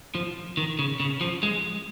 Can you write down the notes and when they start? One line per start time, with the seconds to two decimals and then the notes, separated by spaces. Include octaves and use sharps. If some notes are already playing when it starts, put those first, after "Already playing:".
0.15 F3
0.57 D#3
0.79 C#3
1.00 C#3
1.21 F3
1.43 G#3